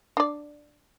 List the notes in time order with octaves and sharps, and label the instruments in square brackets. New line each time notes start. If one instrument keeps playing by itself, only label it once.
[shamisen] D4 D5